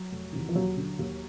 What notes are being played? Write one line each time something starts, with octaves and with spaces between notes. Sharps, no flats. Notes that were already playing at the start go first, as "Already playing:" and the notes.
Already playing: F#3
F1
E2 C3 D#3
F3
D#2 F#3
D3
D#2